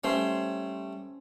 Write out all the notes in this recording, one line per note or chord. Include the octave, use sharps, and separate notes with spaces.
G3 A3 C#4 C5